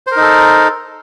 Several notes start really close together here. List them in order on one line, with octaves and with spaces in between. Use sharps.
C5 A#4 D#4 A4